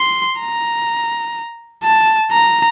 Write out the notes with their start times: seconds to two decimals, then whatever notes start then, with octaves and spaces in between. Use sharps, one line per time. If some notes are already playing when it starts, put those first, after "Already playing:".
Already playing: C6
0.39 A#5
1.84 A5
2.31 A#5